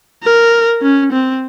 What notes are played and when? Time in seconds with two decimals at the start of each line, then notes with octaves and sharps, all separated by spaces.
0.23 A#4
0.82 C#4
1.12 C4